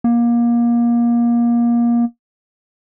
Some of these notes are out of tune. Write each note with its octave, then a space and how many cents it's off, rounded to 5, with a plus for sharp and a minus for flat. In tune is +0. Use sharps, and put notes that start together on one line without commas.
A#3 +25